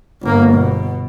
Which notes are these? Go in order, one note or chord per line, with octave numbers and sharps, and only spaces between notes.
G1 A#3
B2